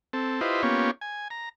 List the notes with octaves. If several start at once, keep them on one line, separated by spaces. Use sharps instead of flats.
C4 A4
E4 F4 G4 B4 C5 D#5
A#3 B3 C#4 F4 G4 C#5
G#5
A#5